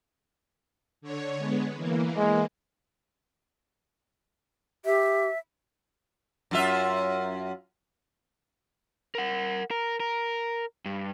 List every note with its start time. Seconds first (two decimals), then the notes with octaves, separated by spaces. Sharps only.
1.01 D3 C#5
1.38 G#3 B3
1.75 E3 A#3
2.17 G#3
4.85 G4 E5
6.51 F#2 F4 E5
9.15 A#4 F#5
9.71 A#4
10.00 A#4
10.85 G2